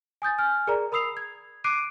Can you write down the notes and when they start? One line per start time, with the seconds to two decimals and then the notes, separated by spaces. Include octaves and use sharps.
0.22 G#5 D#6 G6 A6
0.38 G#5 F6
0.67 G#4 A#4 D5 A#5
0.92 A#4 B5 D#6 E6 C7 F7
1.17 G#6
1.64 D6 F#6 C7 D7 D#7